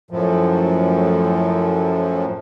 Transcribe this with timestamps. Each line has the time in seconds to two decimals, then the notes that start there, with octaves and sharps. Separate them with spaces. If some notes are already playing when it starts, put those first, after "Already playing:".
0.11 F#2 A2 F3